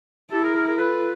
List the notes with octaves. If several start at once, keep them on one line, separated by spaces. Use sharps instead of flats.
E4 G4 A4
G#4 A#4
G#4 A#4
G#4 A#4
F4 A4 B4